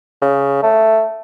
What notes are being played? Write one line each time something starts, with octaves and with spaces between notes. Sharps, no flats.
C#3
A3